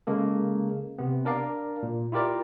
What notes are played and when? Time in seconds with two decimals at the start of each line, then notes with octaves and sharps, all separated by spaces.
0.07 C#3 G#3 A#3 A4
0.98 C3 B3
1.25 D4 A#4 D5 F5
1.83 A#2
2.12 E4 F4 G4 A#4 D5